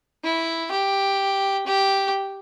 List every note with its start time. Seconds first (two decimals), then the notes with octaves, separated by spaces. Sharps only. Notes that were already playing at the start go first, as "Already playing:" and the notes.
0.24 E4
0.71 G4
1.66 G4